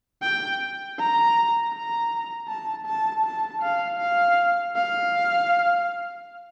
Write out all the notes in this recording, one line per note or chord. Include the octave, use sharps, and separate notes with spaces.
G5
A#5
A#5
A5
A5
A5
F5
F5
F5